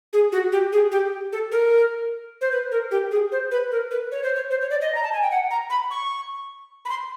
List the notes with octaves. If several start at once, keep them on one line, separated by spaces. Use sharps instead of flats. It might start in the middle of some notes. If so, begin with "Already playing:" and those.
G#4
F#4
G4
G#4
G4
A4
A#4
C5
B4
A#4
G4
G#4
C5
B4
A#4
B4
C#5
C5
C#5
C5
C#5
D5
D#5
A#5
A5
G#5
G5
F#5
A#5
B5
C#6
B5
C6